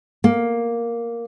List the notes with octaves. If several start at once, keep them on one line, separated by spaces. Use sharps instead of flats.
A#3